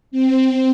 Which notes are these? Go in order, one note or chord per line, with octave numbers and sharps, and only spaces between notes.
C4